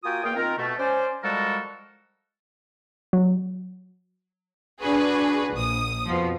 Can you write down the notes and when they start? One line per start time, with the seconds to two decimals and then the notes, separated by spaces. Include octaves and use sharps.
0.04 A#3 F4 F#4 G5 G#5 D#6
0.24 E2 A#3 A#4 F5 G5
0.36 D#3 C4 F4 A#4
0.57 B2 A3
0.78 C#4 C5 D5
1.23 F3 G3 G#3 F#4 A4 A#4
3.13 F#3
4.81 D4 F#4 G#4 B4
5.52 A#1 D#6
6.06 F2 B2 F3